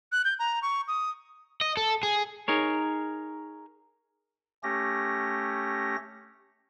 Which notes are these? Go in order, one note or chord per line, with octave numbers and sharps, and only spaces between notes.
F#6
G6
A#5
C#6
D#6
D#5
A4
G#4
D#4 G#4 A#4 C#5
A3 C#4 G4 A#6